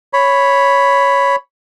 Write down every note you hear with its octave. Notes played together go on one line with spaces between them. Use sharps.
C#5 B5